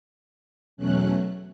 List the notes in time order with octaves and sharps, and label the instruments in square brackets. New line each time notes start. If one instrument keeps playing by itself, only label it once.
[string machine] E2 B2 F#3 A3 C#4 F#6